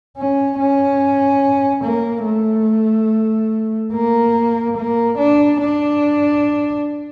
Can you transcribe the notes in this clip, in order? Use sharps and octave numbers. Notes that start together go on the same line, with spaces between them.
C#4
C#4
A#3
A3
A#3
A#3
D4
D4